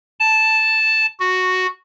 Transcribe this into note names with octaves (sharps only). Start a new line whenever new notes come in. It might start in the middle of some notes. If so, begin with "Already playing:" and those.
A5
F#4